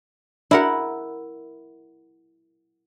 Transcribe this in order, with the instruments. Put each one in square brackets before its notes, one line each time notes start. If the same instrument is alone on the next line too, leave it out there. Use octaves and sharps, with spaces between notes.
[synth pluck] D4 F#4 [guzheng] E4 A#4 F#5